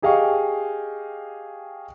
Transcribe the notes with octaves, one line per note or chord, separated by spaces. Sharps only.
G4 G#4 D#5 F5 G5 C#6